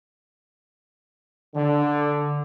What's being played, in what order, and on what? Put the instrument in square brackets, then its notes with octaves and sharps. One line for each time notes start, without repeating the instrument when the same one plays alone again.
[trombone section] D3